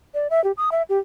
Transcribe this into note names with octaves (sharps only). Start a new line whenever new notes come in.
D5
E5
G4
D#6
E5
G4